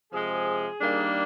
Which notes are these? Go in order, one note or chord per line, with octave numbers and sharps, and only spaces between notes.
C3 F3 G#3 G#4
D#3 G3 A#3 D4